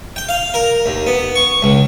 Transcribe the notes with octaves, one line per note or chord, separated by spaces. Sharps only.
G5
F5
A#4
D#2
B3
C#6
C#2